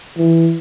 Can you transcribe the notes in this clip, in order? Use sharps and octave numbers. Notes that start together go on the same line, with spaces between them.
E3